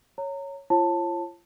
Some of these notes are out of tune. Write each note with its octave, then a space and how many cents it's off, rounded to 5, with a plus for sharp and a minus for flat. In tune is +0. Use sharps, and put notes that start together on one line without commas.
C#5 +0 A#5 -25
F4 -35 C#5 -35 A5 +10